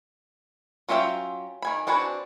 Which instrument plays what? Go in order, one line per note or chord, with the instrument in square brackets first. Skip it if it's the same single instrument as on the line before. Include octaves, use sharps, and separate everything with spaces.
[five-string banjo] F#3 C#4 F4 E5 G5
D#3 G#5 B5
C4 D4 F#4 B4 G#5